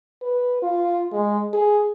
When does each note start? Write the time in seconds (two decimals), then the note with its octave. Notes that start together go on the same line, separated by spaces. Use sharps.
0.22 B4
0.62 F4
1.12 G#3
1.53 G#4